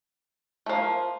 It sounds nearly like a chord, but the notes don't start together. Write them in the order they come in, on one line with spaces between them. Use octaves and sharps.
A3 F3 A#3